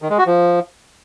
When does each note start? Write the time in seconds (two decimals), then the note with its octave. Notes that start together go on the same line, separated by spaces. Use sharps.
0.02 D#3
0.10 G#3
0.18 F#4
0.26 F3